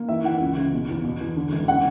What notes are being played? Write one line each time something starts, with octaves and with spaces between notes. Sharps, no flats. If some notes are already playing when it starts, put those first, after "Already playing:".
Already playing: A#3
E3 E5
E3 F#5
C#2
C#3
B2
E2
B2
E2
D3
E1
C#3 F#5